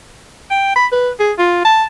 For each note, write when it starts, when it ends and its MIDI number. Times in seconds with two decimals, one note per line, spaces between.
0.51 0.71 79
0.76 0.86 83
0.92 1.10 71
1.20 1.32 68
1.39 1.62 65
1.65 1.84 81